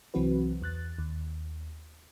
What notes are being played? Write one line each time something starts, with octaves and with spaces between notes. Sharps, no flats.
C2 E3 F#3 C4 F#4 B4
E2 F#6 A6
D#2